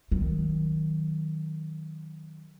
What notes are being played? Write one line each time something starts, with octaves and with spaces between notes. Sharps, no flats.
D#3 F#3